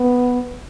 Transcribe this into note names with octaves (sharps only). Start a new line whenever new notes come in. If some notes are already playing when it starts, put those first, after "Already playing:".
Already playing: B3